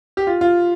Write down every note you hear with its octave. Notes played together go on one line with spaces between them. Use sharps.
G4
F4
F4